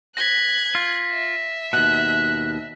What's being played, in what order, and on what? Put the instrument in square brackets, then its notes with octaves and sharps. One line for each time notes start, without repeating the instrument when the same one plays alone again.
[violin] F#6 G#6 [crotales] A#6 B6
[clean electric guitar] F4
[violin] E5
[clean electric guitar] D#2 B2 [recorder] F#6